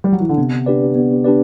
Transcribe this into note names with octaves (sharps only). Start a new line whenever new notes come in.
G3
F#3
E3
D3
C3 B3
D4 G4 B4 D5
B3
D4 G4 B4 D5